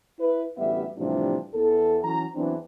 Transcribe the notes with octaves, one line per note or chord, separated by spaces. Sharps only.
E4 B4
A1 D2 G3 B3 E5
A2 C3 E3 F3 G3 D4
E2 A4
E3 F#3 C#4 A#5
E2 E3 F#3 C4 D4